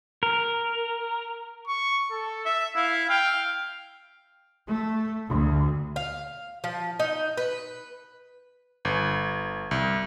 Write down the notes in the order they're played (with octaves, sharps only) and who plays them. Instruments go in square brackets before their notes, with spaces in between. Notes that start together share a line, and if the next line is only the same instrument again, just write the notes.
[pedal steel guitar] A#4
[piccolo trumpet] C#6
A4
[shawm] E5
[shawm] E4 [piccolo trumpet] F5
[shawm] F5 [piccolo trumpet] G5
[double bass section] A3
D2
[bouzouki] F5
F3
D#4
B4
[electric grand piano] G1
C2